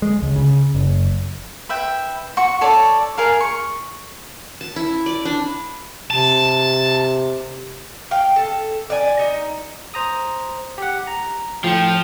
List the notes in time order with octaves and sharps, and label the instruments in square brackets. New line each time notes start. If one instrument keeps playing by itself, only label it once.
[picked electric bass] G#3
C#2
C#3
F#1
[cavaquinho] B4 E5 G5
F#4 C#6
A4 C#5 D5
G#4 A#4 F5
C#6
[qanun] A5
E4
D5
D4
[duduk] C3 [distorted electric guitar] A5
[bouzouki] F5 G5
A4
D5 G#5
D#4
[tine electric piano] C5 A#5 D#6
G4 F#5
A#5
[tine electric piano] A2 C#7 [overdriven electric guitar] F3 [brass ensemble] G5